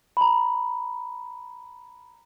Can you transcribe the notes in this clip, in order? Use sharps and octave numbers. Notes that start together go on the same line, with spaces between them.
A#5 B5